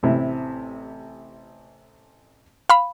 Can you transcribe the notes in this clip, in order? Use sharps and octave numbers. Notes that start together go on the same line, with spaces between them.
A1 C3 E4
F5 B5